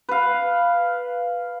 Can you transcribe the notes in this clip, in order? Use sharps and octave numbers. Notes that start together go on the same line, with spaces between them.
B4 F5